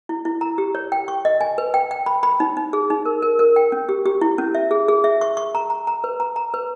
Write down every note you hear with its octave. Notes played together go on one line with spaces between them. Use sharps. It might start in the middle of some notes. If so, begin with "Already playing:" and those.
E4
E4
A#5
G4
C#5
G5
C#6
D#5
G#5
B4
G5
G5
B5
B5
D#4
D#4
G#4
D#4
A#4
A#4
A#4
G5
C#4
G4
G4
E4
C#4
E5
G#4
G#4
E5
C#6
C#6
A#5
A#5
A#5
B4
A#5
A#5
B4